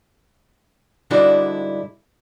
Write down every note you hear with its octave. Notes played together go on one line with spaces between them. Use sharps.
G#2 D3 G3 D4 E4 F#4